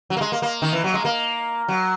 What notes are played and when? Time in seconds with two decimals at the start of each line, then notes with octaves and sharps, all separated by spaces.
0.10 F#3
0.17 A#3
0.21 G#3
0.32 A#3
0.42 A#3
0.62 D#3
0.73 E3
0.84 F#3
0.94 G#3
1.05 A#3
1.68 F#3